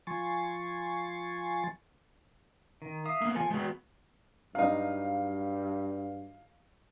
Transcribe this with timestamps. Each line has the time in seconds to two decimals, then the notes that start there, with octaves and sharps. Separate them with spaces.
0.07 F3 G#5 C6 C#6 A6
2.82 D#3
3.06 E5 F5 D#6
3.21 A#3 B3
3.36 F3 A4 G#5
3.50 G#3 B3 F#4 G5
4.55 G2 F#3 D#4 F5